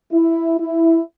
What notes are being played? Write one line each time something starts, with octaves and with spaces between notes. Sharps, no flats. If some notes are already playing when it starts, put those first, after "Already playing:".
E4
E4